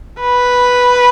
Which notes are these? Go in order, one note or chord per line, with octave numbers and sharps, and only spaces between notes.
B4